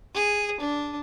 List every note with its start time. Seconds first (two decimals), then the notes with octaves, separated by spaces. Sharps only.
0.14 G#4
0.60 D4